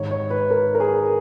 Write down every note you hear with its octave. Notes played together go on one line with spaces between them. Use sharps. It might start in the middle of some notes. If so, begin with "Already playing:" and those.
Already playing: G#2 D#3 G#3 D#4 C#5
C#5
B4
A#4
A#4
G#4